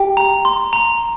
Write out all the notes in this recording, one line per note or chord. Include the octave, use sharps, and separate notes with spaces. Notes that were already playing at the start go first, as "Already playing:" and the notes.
Already playing: G4
A#5
C6
A#5